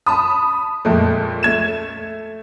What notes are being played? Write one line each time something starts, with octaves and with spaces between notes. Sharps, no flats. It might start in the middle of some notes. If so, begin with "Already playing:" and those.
A5 B5 D#6
F2 A#2 G#3 A3
A3 G#6 E7